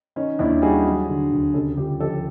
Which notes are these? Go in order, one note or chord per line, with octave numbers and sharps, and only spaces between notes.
D#3 C#4 D#4
D#2 D4 E4
G3 F#4 G#4
F#3
D3
D2
C#3 G4 A4
D2 F4 G4
F3 G4 A4